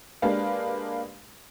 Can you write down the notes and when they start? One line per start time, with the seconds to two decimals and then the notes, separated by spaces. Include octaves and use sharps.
0.22 G#3 A#3 D4 G4 B4 F5